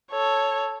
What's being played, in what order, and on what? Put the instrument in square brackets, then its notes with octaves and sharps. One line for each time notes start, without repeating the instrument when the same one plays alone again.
[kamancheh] A4 C#5